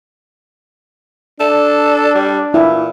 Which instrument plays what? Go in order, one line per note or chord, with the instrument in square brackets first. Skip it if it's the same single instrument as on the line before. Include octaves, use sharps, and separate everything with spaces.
[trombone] D4 [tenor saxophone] A4 [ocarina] D5
[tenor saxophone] G3
[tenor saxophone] A#2 [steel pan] E4